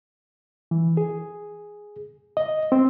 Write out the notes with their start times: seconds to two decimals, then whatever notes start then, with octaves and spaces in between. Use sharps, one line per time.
0.71 E3
0.97 G#4
2.37 D#5
2.72 C4